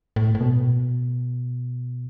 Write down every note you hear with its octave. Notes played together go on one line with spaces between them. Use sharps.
A2
A2
B2